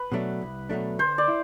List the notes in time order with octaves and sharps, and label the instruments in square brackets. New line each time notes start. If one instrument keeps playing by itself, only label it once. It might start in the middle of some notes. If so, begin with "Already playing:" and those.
Already playing: [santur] B4
[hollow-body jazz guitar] B2 F#3 A3 D4
C2
B2 F#3 A3 D4
[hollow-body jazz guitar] D3 [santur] C5
[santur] D5
[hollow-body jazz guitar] E4